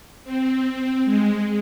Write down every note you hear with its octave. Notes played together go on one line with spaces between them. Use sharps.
C4
G#3